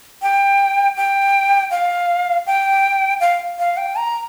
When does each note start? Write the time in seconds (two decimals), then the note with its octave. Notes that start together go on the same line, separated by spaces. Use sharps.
0.22 G5
0.97 G5
1.71 F5
2.47 G5
3.20 F5
3.59 F5
3.77 G5
3.96 A#5